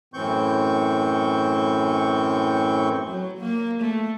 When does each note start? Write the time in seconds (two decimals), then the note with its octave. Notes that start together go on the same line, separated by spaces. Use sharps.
0.14 F#2 A2 E3 C4 C#6 G6
3.06 F#3
3.38 A#3
3.81 A3